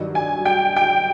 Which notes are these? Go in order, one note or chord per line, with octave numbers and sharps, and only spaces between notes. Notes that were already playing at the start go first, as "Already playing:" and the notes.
Already playing: G2 D#3 F#3
G#5
G5
G5